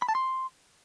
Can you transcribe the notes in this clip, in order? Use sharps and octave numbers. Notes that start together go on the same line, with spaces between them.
B5
A5
C6